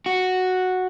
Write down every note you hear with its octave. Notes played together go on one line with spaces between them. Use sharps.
F#4